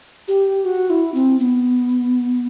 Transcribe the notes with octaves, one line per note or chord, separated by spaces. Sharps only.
G4
F#4
E4
C4
B3